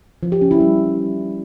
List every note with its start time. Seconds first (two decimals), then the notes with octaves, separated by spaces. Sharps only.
0.23 F3
0.32 G4
0.41 C#4
0.51 E4
0.60 G3